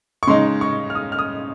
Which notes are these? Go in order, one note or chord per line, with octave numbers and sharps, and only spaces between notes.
C#6
C#3 G#3 D#4 C6
C#6
F6
D#6
F6
D#6